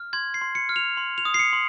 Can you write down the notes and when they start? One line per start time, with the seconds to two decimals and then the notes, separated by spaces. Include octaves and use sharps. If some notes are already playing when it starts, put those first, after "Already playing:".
Already playing: F6
0.13 C6 G#6
0.34 C7
0.42 C6
0.55 C#7
0.69 F6
0.76 F7
0.97 C6
1.18 F7
1.25 D#6
1.34 C7
1.39 C#7
1.53 C6